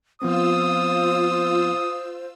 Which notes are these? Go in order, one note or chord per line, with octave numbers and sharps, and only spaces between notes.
F3 B3 C4 F4 C5 D#6 E6